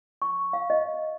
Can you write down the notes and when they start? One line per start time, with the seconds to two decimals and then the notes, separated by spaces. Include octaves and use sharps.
0.22 C#6
0.53 F5
0.70 D#5